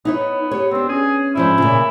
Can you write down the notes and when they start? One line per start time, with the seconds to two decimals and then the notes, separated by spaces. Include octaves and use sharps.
0.05 B3 D#4 E4 C#5
0.51 G4 C#5
0.71 B3 C4 D4
0.89 C#4 G#4
1.35 G#2 F3 D4 E4
1.58 A#2 C#3